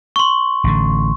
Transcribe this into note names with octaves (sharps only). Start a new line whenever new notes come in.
C6 C#6
A1 D3